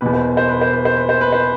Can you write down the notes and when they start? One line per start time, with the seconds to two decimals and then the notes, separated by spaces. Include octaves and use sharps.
0.01 E2 B2 B4
0.14 C5
0.25 B4
0.37 C5
0.49 B4
0.61 C5
0.73 B4
0.85 C5
0.97 B4
1.09 C5
1.21 B4
1.32 C5